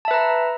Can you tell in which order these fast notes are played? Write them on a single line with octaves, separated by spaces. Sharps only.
A5 E5 B4 A#5